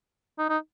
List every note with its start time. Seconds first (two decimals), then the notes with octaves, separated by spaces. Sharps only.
0.38 D#4
0.50 D#4